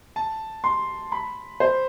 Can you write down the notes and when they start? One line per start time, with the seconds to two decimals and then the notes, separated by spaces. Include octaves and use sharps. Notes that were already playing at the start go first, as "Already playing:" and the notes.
0.16 A5
0.64 C6
1.12 B5
1.60 C5